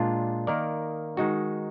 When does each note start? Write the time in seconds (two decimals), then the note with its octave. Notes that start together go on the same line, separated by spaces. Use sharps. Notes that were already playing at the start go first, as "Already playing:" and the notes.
Already playing: A#2 G#3 D4 F4
0.47 D#3 A#3 D#4 A#4 D5
1.17 D#3 G#3 D#4 F#4